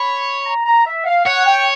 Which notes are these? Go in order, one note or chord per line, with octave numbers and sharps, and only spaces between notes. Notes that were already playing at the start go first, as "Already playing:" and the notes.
Already playing: C#5 B5
A#5
A#5
E5
F#5
F5
C#5 F#5
G5